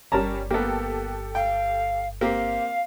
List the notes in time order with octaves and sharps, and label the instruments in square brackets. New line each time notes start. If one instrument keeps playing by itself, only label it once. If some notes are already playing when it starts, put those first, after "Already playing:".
[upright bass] G1 [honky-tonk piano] G3 C#4 [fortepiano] A#4 A5 A#5
[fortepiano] A#3 B3 [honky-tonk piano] G4 A4
[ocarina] F5 [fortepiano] G5
[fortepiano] A#3 C4 G4 [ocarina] F5